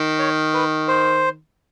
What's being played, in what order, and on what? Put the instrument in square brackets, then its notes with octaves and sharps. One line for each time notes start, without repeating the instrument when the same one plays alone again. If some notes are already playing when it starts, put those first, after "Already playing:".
Already playing: [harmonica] D#3
[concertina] C#5
B4
C5